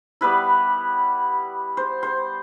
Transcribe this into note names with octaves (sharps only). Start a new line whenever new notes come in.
G3 B3 E4 B4
C5
C5